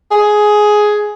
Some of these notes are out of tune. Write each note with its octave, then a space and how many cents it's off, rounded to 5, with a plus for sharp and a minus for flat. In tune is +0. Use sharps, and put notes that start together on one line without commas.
G#4 +10